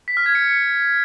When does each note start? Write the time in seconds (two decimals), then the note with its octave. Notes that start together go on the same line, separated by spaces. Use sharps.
0.08 B6
0.17 F6
0.26 G#6
0.35 C#7